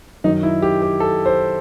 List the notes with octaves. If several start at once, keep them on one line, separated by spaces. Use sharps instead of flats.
F#2 D#3 F#3 D#4
E4
G4
G4
A4
C5